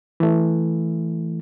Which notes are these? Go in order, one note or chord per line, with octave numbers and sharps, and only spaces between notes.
E3 A3